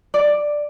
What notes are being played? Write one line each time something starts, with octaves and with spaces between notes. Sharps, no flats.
D5